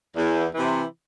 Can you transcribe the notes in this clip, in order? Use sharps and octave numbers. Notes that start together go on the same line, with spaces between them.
E2
C3 E3